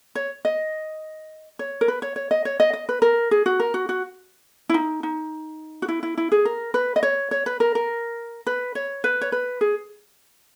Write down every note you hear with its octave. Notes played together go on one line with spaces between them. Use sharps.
C#5
D#5
C#5
A#4
B4
C#5
C#5
D#5
C#5
D#5
D#5
B4
A#4
G#4
F#4
A#4
F#4
F#4
E4
D#4
D#4
F#4
E4
E4
E4
G#4
A#4
B4
D#5
C#5
C#5
B4
A#4
A#4
B4
C#5
B4
C#5
B4
G#4